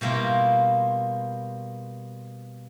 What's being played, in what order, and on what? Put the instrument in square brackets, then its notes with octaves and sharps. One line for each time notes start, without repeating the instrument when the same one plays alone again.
[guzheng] B2 G3 A#3 E4 F4